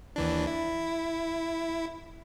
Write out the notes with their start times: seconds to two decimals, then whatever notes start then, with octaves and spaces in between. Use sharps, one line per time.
0.16 D#2 E3 D4
0.47 E4